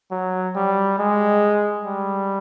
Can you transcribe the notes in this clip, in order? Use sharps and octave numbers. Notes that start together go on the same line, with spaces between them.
F#3
G3
G#3
G3